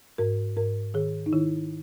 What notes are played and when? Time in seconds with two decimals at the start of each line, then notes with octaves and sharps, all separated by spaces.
0.18 G#2 A#4
0.57 G#2 A#4
0.94 D#3 G#4
1.26 D#4
1.33 D#3 E4